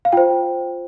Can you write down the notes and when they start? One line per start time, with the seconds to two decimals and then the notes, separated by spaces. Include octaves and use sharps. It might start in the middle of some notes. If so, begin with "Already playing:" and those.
0.05 F5
0.12 F4 C5 G5